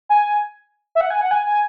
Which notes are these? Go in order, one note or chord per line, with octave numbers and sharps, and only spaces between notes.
G#5
E5
F#5
G#5
F#5
G#5
G#5